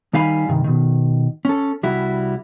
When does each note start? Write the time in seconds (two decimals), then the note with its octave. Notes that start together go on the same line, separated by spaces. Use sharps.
0.13 D#3 G3 D#4 F5 G#5 B5
0.48 G2 C3 D#3
0.64 B2 D#3
1.45 C#4 A4
1.83 C2 G3 E4 F#4